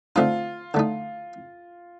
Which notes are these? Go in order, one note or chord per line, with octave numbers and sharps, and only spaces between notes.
D3 A3 C4 D#4 F4
D3 A3 D#4